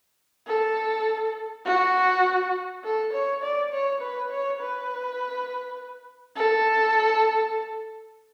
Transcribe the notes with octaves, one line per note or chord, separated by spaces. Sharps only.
A4
F#4
A4
C#5
D5
C#5
B4
C#5
B4
A4